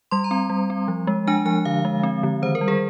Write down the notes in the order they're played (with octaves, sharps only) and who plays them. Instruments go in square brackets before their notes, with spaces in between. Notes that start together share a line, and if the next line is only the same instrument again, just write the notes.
[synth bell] G3 C6
A#5
C4
G3
C4
F3
G#3
D4 G#5
F3 G#5
D3 F5
G#3
C4
D3
D#3 C5
A#4
G3
G#4